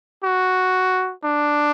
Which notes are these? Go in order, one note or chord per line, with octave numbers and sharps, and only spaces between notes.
F#4
D4